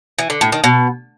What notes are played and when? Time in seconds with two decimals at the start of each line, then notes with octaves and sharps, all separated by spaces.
0.19 E3
0.30 D3
0.41 A2
0.52 D#3
0.64 B2